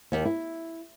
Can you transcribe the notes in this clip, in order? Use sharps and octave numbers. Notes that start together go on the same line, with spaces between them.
D#2
E4